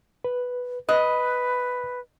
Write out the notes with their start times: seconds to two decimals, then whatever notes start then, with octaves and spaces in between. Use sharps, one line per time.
0.24 B4
0.89 B4 D#5 B5 F#6